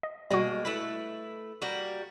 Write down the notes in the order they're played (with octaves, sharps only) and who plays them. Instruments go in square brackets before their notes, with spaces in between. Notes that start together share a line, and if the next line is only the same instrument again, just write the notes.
[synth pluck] D#5
[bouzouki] B2 G#3 A#3 [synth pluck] G3 F#4
[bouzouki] A3 E4 B4
G3 A#3 F#4